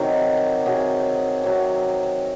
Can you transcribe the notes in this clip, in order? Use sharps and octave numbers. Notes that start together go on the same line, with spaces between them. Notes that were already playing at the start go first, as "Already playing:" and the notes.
Already playing: C3 D#3 F#3
C3 F#3 G#4
C3 F#3